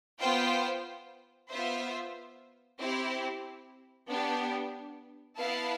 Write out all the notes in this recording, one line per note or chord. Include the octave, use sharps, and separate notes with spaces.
B3 F4 C5 G5
B3 F4 C5 E5
C4 E4 G4
B3 D4 G4
B3 E4 B4 F5 A5